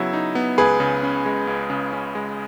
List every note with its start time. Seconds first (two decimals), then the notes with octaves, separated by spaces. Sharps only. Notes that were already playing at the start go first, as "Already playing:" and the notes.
Already playing: C#3 F#3 B3 E4
0.13 D#4
0.35 B3
0.58 C#2 G#4 B4
0.80 C#3
1.03 C#4
1.26 G#3
1.47 C#2
1.70 C#3
1.93 C#4
2.15 G#3